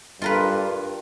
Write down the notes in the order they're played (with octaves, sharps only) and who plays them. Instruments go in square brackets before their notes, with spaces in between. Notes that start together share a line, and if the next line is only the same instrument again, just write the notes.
[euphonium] G2 [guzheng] F4 A#4 B4